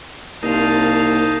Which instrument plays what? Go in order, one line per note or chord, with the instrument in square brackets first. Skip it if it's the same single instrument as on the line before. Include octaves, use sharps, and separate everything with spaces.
[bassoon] C2 [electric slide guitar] A#3 C4 [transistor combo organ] D#4 [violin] F5 A5